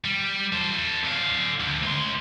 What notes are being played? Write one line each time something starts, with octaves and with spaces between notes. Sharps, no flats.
G3
A4 C5
D3 F5
D2
C#2 C6